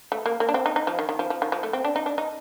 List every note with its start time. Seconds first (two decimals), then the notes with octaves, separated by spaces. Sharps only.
0.12 A3
0.26 A#3
0.40 A#3
0.49 D4
0.54 C4
0.66 D#4
0.76 D#4
0.87 F3
0.99 D#3
1.09 D#3
1.19 F3
1.30 F3
1.42 D#3
1.52 F3
1.63 A3
1.73 C4
1.85 D4
1.96 D#4
2.06 D4
2.18 D#4